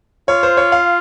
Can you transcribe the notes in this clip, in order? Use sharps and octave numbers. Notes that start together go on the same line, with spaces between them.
F4 C#5
C5
C#5
F5